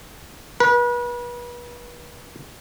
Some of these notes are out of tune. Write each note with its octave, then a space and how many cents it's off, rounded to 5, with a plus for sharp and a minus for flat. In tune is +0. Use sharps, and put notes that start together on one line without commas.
B4 -35